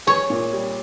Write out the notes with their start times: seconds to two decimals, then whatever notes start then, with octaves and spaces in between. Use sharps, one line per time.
0.07 G#4 C#5
0.30 A#2
0.53 G3